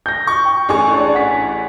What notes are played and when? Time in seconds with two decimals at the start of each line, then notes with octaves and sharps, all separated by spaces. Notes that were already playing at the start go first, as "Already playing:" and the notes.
0.06 G6 A#6
0.27 C#6
0.45 G5
0.69 A1 G#4 C#6
0.94 D4 D5
1.14 F#5 B6